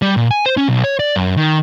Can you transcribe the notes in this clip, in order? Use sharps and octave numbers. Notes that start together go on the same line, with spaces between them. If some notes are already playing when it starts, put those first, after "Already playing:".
G3
A#2
G#5
C5
C#4
B1
C#5
D5
F#2
D#3